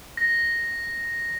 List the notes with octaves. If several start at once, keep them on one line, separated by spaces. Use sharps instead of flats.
A#6